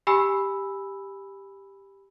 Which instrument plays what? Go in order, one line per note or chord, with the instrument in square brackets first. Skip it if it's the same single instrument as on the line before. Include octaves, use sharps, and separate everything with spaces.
[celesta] G4 G#5 B5 E6